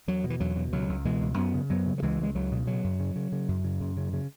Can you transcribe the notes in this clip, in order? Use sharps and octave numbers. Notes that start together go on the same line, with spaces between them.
E2 F#3
B2
E3
E2 F#3
B2
C#2 F#3
C#2
B2 E3 G#3
C#2
F#2 F#3 B3
C#3
F#2 F#3 B3
C#3
F#3
C#2 E3 G#3
C#2 G#3
C#2 F#3
B2
C#3 F#3
F#2
C#3
C#3
C#3
F#2
C#3
F#2
C#3
C#3